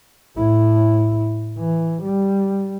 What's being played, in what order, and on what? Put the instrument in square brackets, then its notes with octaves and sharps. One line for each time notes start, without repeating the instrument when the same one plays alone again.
[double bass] A2 E4
E3
G3